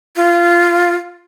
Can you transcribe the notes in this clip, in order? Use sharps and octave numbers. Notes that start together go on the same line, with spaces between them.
F4